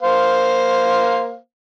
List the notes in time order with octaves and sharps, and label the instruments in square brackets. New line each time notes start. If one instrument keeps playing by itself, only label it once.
[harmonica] A#3 C5 F5